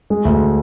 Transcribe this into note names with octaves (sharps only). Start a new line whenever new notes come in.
G#3
D2